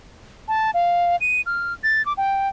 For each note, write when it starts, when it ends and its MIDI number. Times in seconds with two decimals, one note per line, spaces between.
0.48 0.71 81
0.74 1.16 77
1.21 1.41 99
1.46 1.73 89
1.83 2.04 93
2.06 2.13 86
2.18 2.49 79